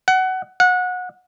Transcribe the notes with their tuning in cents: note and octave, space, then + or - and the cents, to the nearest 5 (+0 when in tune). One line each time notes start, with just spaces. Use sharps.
F#5 +20
F#5 -25